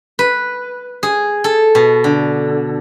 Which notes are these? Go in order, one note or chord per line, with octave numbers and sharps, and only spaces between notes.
B4
G#4
A4
B2
D3